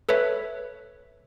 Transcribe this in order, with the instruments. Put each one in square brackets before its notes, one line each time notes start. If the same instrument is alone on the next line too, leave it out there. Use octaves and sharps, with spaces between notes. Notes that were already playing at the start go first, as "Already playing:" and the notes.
[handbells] A4 B4 C#5 E5